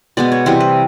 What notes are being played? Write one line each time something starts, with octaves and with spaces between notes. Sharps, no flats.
B2 G#3 B3 D5
C#5
C3 E3 G3 C5
B4